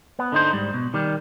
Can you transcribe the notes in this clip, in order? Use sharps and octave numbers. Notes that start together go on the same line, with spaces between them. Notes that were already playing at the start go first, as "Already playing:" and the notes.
B3
D3 D#4 C5
G#2 G3
B2
D#3 G3